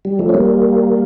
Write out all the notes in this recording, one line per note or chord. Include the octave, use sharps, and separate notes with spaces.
G3
F3 A3
C#4
G3 A#3